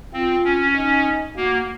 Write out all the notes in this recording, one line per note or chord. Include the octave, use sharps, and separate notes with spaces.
C4 F4
C#4
D#4
A#3 F#4